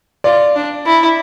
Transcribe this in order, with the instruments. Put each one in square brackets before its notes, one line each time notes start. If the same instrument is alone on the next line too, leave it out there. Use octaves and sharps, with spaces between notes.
[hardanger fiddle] F4 [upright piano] D5
[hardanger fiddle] D4
E4